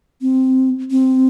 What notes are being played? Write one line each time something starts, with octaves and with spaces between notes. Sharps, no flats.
C4
C4